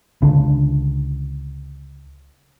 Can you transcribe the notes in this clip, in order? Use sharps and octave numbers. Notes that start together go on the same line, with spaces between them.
C#2 D3